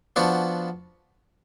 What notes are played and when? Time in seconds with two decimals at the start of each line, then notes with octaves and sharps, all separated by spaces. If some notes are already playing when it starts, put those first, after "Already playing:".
0.16 F3 B3 D4 F#4